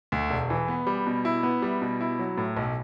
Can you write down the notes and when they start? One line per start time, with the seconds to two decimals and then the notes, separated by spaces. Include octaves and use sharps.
0.12 D2
0.30 E1
0.50 E3
0.68 B3
0.87 G3
1.07 B2
1.25 E4
1.43 B3
1.62 G3
1.82 B2
2.01 E4
2.19 F#3
2.38 A2
2.57 B1